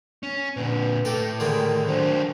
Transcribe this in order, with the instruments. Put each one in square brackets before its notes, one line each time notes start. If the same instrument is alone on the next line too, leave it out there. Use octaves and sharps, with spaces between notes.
[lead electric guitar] C#4
[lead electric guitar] A#2 D3 [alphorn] B4
[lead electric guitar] A2 [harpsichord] G4 A4
[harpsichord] D3 D#3 G#3 [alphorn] A#4
[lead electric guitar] F#3 D4 [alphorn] C5